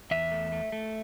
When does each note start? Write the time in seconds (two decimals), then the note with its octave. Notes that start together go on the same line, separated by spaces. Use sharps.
0.11 E2 E5
0.31 A3
0.52 A3
0.72 A3